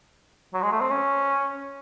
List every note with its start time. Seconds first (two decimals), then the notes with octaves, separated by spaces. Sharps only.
0.54 F#3
0.62 G#3
0.72 A3
0.81 C4
0.90 C#4